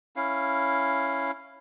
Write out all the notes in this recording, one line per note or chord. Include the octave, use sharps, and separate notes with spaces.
C#4 E4 F5